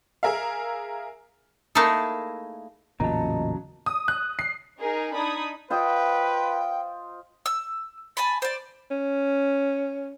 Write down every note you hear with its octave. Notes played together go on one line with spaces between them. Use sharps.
G#4 A#4 E5 F5
A3 A#3 D#4 E4 G#4 A4
A1 E2 A#2 C#3 F#3 D#5 A5 A#5
D#6
F#6
C7
D#4 G#4 A#4
D4 D#4 B5 D#6 G#6
F4 B4 C5 D#5 G5
E6
G#5 A5 B5
C5 D5
C#4